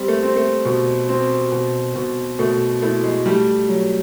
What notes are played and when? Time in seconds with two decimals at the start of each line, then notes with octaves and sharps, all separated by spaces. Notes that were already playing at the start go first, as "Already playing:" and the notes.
Already playing: G3 C4
0.08 A3
0.23 C4
0.36 A3
0.65 B2
1.09 C4
1.52 B2
1.95 B2
2.39 B2 A3
2.82 A3 E4
3.04 G#3
3.26 G3 A3
3.69 F#3